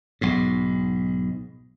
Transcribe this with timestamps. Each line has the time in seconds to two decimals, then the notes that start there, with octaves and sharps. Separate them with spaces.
0.21 B1 G#2